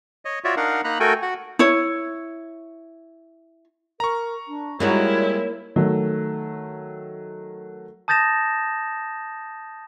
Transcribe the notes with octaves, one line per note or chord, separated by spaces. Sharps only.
C#5 D#5
F4 F#4 C#5 D5 E5
D4 D#4 A#4 F5 F#5
A#3 D#4 A#5 B5 F#6
A3 F#4 A4 A#4 G5 G#5
F#4 F#5
E4 C#5
A#4 A#5 C#6
D4
G3 G#3 A#3 D#4 E4 F#4 C#5
D#3 F#3 A3
A5 D#6 G6 A6 A#6 E7